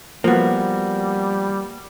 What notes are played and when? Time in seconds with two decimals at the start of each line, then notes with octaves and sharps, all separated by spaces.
0.24 F3 G3 A#3 B3 F#4